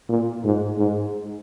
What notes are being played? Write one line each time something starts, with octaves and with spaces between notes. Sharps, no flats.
A#2
G#2
G#2